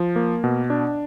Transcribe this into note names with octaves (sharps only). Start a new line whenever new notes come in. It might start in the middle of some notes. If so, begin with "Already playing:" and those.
Already playing: F3
A#3
B2
D4